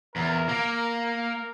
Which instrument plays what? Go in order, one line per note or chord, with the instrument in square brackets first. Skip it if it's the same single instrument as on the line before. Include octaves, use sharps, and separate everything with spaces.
[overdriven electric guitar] E2 [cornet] A#4
[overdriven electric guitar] A#3
[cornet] A#4